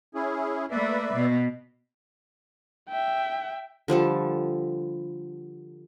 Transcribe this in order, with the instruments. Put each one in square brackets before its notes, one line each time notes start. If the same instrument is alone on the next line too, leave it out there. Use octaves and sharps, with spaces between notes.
[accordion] C#4 E4 G#4
[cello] A3 A#3 [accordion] B4 D5 E5
[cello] B2
[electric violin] E5 G5
[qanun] D3 F3 G3 A4